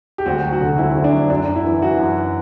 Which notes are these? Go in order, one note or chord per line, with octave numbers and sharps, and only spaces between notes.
G4
D2 F#4
F#3
F#4
D3
D2 E4
D2
D4
F#3
F#2 D4
F#2
E4
E3
E3 F#4
F#2